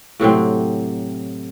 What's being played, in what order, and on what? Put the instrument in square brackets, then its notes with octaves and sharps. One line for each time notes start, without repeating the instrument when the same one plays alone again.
[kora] A2 C3 F#3 C4